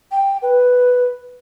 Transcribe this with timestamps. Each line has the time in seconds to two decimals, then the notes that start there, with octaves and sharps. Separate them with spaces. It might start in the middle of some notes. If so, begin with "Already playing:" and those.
0.12 G5
0.42 B4